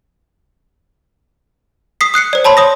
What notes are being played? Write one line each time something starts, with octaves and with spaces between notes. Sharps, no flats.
D#6 B6 C7
D#6 F#6 C7 C#7
C5 D5
C#5 A5 B5 C6
C#5 D#6 A#6